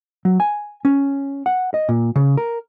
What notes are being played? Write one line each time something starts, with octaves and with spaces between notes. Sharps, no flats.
F#3
G#5
C#4
F#5
D#5
A#2
C#3
A#4